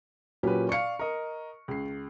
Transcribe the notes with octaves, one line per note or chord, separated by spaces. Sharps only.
A#2 F#3 C#4 G4 B4
D5 F5 C#6 C#7
A#4 D#5
C#2 C7